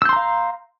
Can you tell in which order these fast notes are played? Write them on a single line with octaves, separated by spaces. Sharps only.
E6 G6 C6 A#5 F5